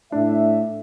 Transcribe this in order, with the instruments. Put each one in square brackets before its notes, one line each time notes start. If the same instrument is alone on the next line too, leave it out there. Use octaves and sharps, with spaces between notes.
[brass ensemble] A2 E5 [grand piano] D4